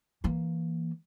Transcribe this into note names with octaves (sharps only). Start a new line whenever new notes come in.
E3 A#3